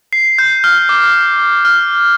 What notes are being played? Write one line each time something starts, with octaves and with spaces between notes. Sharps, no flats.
C7
G6
F6
D6
F6